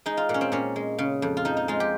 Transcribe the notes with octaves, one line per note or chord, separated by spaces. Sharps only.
G#3 D#4
F4
A#2
C#4
C4
A#2 C#4
G#3
C#3
F2
F4
F3 D#4
D#4
G#3 F4
G4